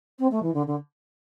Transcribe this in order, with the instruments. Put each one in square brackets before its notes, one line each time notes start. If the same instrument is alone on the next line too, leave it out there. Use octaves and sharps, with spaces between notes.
[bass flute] C4
A3
E3
D3
D3